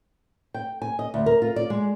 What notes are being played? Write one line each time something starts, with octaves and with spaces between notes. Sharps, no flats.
G5
G#5
D#5
D2
A#4
F4
D5
G#3